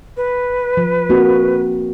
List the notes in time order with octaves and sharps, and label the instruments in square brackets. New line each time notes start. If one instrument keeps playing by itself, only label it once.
[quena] B4
[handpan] F3
A#3 C4 F#4